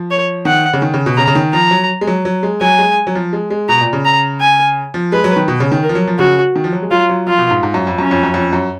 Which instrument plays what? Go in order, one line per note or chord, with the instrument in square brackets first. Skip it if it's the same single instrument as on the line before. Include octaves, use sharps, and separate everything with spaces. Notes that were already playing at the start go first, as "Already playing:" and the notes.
Already playing: [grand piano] F3
[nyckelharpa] C#5
[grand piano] D#3 [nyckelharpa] F#5
[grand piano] C#3
D#3
C#3
B2
[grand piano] C#3 [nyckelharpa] A#5
[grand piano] C#3
D#3
[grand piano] F3 [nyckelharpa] A#5
[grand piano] F#3
G#3
F#3
F#3
G#3
[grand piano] F#3 [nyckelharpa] G#5
[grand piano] G#3
F#3
F3
G#3
G#3
[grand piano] B2 [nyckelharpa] A#5
[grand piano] A#2
C#3
[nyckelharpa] A#5
G#5
[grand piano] F3
[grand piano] G#3 [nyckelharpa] B4
[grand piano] F#3
D#3
B2
C#3
D#3
[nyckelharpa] A#4
[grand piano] F3
F#3
F3
[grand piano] C#3 [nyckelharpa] F#4
[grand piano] D#3
F3
F#3
G#3
[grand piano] F#3 [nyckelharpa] F4
[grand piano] F#3
[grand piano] F3 [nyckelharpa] F4
[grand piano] B2
G#2
G#2
F#2
F2
[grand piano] F#2 [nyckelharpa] C#4
[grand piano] F2
F#2
F2
F#2